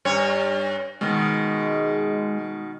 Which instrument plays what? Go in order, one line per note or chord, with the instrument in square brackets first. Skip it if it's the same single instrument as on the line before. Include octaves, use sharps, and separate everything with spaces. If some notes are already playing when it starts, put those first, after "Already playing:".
[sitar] G2 C#5
[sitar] B2 D#3 [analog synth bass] G#3